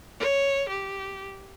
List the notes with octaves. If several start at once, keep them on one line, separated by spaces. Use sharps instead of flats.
C#5
G4